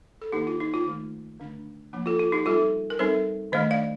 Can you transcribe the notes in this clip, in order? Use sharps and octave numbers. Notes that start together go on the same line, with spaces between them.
A4
D#3 A#3 D4 D#4 G4
F4
D#4
F4
D#3 A3 D#4
D3 A3 D4
F3 A#3 D4
F4 A4
F4
D#4 G4
G3 C4 D#4 F4 A4
A#4
G3 C4 D#4 A4 C5
D#3 A3 D4 C5 D#5
D5 F5